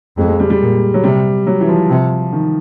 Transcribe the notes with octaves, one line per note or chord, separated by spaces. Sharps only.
F2 G#3
G#3
G3
G3
A#2
F#3
C3 G3
F#3
E3
F3
C3
D#3